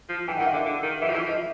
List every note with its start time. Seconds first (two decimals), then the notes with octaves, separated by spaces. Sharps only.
0.09 F3
0.27 E3 G5
0.37 D#3 F#5
0.46 F5
0.53 D3
0.56 E5
0.65 D3
0.83 D#3
1.01 E3 E5
1.10 F3
1.15 E3
1.26 F3
1.29 D#5